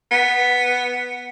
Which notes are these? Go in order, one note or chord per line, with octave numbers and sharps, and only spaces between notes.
B3